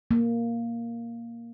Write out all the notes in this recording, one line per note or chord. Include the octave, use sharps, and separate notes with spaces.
A#3